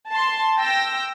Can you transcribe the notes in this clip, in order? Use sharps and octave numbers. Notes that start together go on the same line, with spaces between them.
A5 C6
G5 E6 A#6